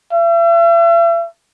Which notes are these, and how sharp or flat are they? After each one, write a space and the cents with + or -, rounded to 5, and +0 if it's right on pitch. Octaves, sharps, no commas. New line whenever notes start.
E5 +40